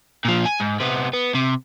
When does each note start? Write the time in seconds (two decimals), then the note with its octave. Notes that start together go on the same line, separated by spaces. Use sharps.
0.25 A#2 F3
0.46 G#5
0.60 G#2
0.80 C3 B3
1.13 B3
1.35 C3